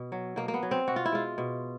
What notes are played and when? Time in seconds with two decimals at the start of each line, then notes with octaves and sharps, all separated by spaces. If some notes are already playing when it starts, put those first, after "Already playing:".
Already playing: B2
0.12 F#3
0.36 B2 A#3
0.48 A#3
0.54 B3
0.63 F#3
0.71 C4
0.87 B2 F#4
0.96 F4
1.05 E4
1.12 G#3 F4
1.38 B2